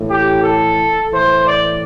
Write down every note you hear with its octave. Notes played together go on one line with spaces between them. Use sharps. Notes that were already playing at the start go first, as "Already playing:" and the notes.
Already playing: A2 E3
G4
A4
A2 E3 C5
D5